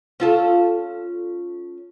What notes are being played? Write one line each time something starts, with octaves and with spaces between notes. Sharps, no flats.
C#4 F4 A4